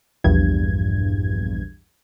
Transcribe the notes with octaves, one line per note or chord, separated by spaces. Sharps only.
A#1 E2 G2 G#6